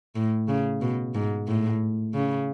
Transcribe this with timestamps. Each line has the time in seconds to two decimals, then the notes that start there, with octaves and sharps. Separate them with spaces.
0.16 A2
0.48 C#3
0.81 B2
1.15 G#2
1.48 A2
2.14 C#3